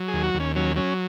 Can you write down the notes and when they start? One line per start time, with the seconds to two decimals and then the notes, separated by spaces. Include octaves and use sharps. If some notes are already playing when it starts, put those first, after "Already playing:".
Already playing: F#3
0.08 G#4
0.13 D#2
0.24 F#4
0.34 D#2
0.40 C#4
0.56 F#3 C#4
0.76 F#3 C#4